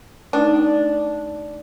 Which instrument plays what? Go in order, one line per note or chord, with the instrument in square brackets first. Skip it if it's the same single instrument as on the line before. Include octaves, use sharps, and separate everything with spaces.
[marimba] A3 D#4 [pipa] D4